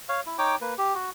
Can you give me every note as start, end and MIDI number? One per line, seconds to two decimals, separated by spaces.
0.09 0.21 73
0.09 0.21 77
0.26 0.37 64
0.38 0.55 63
0.38 0.55 73
0.38 0.55 79
0.38 0.55 86
0.61 0.74 58
0.61 0.74 71
0.78 0.94 67
0.94 1.10 66